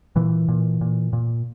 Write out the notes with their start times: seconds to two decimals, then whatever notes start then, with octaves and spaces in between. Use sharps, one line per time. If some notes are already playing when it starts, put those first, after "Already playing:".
0.16 A#2 E3
0.48 A#2
0.81 A#2
1.13 A#2